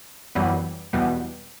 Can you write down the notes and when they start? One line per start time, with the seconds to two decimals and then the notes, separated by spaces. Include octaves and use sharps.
0.35 F#2 E3 G3 B3
0.93 E2 B2 G3 B3